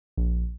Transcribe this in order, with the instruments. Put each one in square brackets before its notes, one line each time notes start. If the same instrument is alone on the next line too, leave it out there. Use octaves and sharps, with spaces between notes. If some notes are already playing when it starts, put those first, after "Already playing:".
[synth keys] A#1